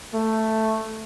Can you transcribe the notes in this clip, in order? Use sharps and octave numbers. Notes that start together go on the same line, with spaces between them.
A3